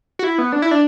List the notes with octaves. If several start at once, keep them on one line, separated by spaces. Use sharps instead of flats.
F#4
E4
B3
D4
E4
D4